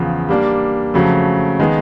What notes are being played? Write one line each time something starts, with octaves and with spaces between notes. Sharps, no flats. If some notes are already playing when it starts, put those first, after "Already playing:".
Already playing: E2 C#3 F3
G3 A#3 D4
F2 C#3 F#3 A3
D#3 G#3 B3